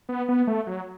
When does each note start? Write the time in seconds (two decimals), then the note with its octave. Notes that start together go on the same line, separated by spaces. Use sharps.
0.09 B3
0.29 B3
0.47 A3
0.67 F#3